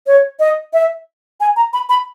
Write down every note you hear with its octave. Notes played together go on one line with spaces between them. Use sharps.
C#5
D#5
E5
G#5
A#5
B5
B5